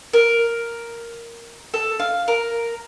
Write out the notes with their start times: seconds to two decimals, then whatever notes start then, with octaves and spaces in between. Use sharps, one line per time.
0.13 A#4
1.74 A4
2.00 F5
2.28 A#4